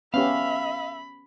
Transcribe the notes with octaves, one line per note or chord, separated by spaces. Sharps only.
B3 C#4 G4 E5 F5 B5